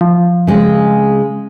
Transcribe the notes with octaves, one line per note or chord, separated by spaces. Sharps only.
F3
C#3 G#3 C4